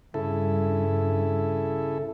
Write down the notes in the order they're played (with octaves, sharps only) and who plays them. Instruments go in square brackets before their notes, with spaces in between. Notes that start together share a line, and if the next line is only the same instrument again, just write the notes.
[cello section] G2 [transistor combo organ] C#3 E4 A4